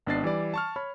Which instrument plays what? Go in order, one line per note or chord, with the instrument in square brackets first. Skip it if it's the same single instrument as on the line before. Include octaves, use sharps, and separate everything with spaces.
[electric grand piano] G#1 B3 D4 D#5 A6 C7
E3 G3 D5
A5 C#6 F6
C#5 B5 F6